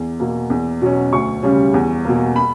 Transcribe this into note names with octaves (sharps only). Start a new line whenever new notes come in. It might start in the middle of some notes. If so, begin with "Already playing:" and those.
Already playing: E2
B2 A#3
E2
B2 F#3 C#4
D2 C#6
C#3 G3 C#4
E2
B2 A#3
B5